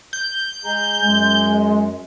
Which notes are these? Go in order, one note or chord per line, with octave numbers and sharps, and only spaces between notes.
G6
G#3 G#4 A#5
F#2 G#3